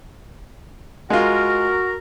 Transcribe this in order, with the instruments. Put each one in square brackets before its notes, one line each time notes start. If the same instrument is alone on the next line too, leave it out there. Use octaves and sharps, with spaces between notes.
[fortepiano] G#3 F4 [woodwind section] F#4 A#4